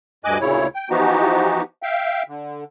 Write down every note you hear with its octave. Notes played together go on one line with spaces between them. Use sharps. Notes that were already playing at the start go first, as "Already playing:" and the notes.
D2 G2 D#5 G#5 D6 F#6
D2 A#2 C#3 E4 C#5
G5
E3 F3 B3 D#4 F#4 G4
E5 F5 G5
D3